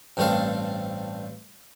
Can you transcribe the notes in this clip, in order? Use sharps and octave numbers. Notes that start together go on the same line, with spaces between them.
A1 G2 A3 C4 A4 F5